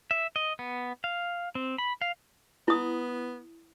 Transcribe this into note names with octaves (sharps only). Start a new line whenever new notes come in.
E5
D#5
B3
F5
C4
B5
F5
B3 E4 D#6